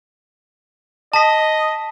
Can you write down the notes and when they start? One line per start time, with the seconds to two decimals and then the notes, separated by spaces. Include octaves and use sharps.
1.14 D#5 A5 B6